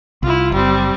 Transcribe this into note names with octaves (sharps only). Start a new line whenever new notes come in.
C2 E4 F4
F#1 G3 C4